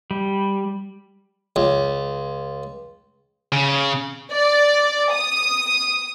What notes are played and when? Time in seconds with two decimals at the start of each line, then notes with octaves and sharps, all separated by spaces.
0.11 G3
1.56 C#2
3.52 C#3
4.31 D5
5.12 D#6